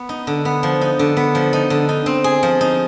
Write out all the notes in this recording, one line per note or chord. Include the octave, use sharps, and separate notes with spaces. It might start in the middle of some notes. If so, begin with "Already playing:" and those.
Already playing: B3
D#4
D3
B3
F3
D#4
D3
B3
F3
D#4
D3
D#4
C4
G#4
F3
D#4